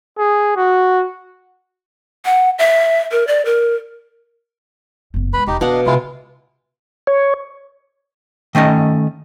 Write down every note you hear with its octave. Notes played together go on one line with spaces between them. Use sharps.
G#4
F#4
F#5
E5
A#4
D5
A#4
F#1 B3
C3 G#3 B4 B5
E1 D#4 G4
B2 D#3 D4 D#5 F5 F#5
C3 G#3 E4 F4
C#5
D#3 A3 C#4 D#5